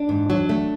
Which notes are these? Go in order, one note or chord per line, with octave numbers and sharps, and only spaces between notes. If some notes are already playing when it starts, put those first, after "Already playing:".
Already playing: D4
G#2
F#3
A3